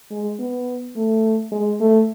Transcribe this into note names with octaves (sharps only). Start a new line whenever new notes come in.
G#3
B3
A3
G#3
A3